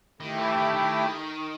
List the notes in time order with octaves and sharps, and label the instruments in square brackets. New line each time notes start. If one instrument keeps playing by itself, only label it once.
[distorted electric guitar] D#3 [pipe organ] A3 E4 G4
[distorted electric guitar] E3
D#3
D#3